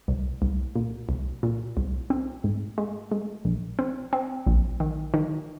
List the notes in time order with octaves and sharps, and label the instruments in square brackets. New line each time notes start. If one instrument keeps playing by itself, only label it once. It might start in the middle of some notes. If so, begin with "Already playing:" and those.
[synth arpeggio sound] C2
C2
A#2
C2
A#2
C2
C4
G#2
G#3
G#3
A#1
C4
C4
A#1
D#3
D#3